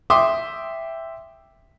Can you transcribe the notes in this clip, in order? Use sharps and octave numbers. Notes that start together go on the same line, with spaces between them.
E5 G5 C6 D6 D#6